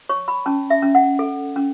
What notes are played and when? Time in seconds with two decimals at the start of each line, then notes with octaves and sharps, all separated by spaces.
0.09 C#5 C#6
0.28 B5
0.46 C#4 A5
0.70 E5
0.82 C#4
0.95 F#5
1.19 A4
1.56 C#4